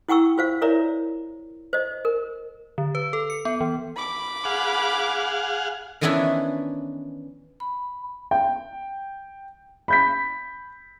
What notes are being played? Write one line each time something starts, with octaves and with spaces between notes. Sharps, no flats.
E4 F#5 G5 C#6 E6
F4 C5 F5
E4 A#4 C#5 D5 E5 A#5
C5 D#5
A#4
D3
B4
A4
C#7
B3
E3
B5 D6
G#4 F5 F#5
D#3 E3 B3 C#4 D4 E4
B5
G5
B5 G6 B6